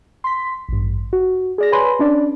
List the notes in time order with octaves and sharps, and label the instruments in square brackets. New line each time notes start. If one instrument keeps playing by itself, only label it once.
[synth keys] C6 B6
A1 G2
F#4
G#4 D5 A#6
B4 C#5 G#5 B5 C6
C#4 D4 D5